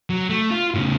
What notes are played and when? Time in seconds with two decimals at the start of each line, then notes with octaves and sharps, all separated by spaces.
0.10 F#3
0.29 A3
0.51 F4
0.74 A2 C#3